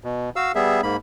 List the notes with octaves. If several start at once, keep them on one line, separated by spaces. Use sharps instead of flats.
B2
F#4 F5 E6
G3 B3 G#4 E5
G#2 A#3 B5